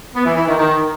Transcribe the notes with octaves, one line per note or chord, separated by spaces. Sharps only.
B3
E3
E3
D#3
D#3